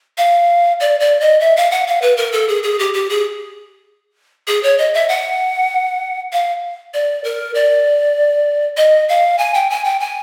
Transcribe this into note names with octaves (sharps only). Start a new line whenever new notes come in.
F5
D5
D5
D#5
E5
F5
F#5
F5
B4
A#4
A4
G#4
G#4
G4
G4
G#4
G#4
C#5
D#5
E5
F#5
F5
D5
A#4
D5
D#5
F5
G#5
G5
G#5
G5
G#5